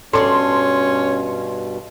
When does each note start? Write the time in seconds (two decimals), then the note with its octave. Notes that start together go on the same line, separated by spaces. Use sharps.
0.13 G2 B2 C#4 A4 D5 C6